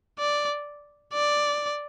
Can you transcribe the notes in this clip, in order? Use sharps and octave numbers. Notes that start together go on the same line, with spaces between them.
D5
D5